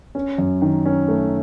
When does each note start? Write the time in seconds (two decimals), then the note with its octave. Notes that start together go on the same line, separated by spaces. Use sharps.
0.15 C#4
0.38 F#2
0.62 D#3
0.86 C#4
1.08 A3